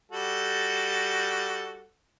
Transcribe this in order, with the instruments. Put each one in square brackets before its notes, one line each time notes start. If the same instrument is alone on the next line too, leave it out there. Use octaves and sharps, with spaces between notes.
[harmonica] G3 F#4 A4